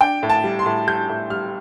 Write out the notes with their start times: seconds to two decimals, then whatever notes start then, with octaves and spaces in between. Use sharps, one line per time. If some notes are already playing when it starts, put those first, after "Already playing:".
0.01 D4 G5
0.23 A2
0.30 A5
0.44 G3
0.59 C6
0.66 A2
0.87 G3 G6
1.09 A2
1.30 G3 F6